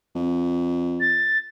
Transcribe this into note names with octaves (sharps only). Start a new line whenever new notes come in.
F2
A6